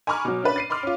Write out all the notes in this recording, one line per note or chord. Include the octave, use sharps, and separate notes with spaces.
G#5 A#5 B5 C#6 D6 F6
B2 F#3
C#4 D4 B4
A6 C7 D#7
B5 C6 D6 F6
C#4 F4